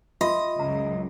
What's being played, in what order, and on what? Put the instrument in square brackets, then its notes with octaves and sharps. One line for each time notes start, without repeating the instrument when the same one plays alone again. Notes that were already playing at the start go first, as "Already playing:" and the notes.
[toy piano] F4 E5 C6 [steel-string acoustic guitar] D#5
[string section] C#2 F#2 [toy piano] A#5